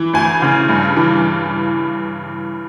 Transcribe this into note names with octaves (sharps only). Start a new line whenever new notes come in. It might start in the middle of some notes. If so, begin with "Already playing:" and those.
Already playing: E3
D2 G#5
C#3
G2
E3